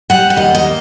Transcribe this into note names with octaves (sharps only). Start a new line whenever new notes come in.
G3 F#5
F#5
D#2 D#5
D#5
A#3